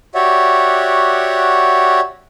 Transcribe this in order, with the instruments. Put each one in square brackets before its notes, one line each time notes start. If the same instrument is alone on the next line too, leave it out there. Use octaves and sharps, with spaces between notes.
[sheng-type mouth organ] F#4 G4 C#5 D5 E5 F#5